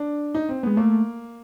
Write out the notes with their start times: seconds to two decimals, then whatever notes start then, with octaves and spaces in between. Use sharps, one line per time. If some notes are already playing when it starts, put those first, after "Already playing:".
Already playing: D4
0.35 D#4
0.49 C4
0.63 G#3 B3
0.77 A3 A#3